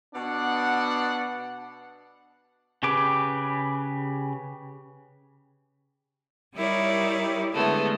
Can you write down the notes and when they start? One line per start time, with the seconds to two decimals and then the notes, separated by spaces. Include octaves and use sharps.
0.14 B2 B3 D4 D5 F#5
2.83 C#3 G4 G#4 B4 D6
6.55 G3 D#4 E4 A#4 C#5 D5
7.53 D3 G#3 A3 B3